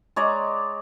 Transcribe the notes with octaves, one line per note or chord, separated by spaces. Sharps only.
G#3 C#5 D5 A#5